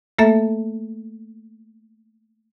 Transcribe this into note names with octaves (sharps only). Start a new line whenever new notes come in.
A3 A#3 A4 E5